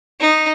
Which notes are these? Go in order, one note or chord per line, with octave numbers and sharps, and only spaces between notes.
D#4